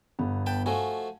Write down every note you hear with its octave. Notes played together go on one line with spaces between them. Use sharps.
G1 B3
B4 G5 A5
F3 A3 F#4 G#5